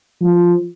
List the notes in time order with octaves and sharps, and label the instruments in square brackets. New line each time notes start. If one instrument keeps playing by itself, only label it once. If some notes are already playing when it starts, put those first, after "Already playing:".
[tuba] F3